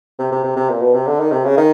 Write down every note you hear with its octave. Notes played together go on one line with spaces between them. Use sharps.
C3
C3
C3
C3
A#2
B2
C3
D3
D#3
C3
C#3
D#3